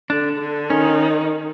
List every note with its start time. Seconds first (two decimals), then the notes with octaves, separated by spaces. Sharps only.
0.10 D3 D4
0.40 D3
0.70 D#3 C#4